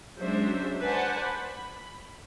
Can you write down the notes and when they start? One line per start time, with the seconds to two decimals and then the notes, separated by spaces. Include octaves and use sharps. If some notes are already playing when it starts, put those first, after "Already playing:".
0.18 F#3 G#3 C#4 D4 C5 E5
0.81 B4 C5 D5 F#5 G#5 A5
1.20 B5